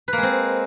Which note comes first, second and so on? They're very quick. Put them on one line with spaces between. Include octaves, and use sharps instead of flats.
B4 A#3 G#3 C4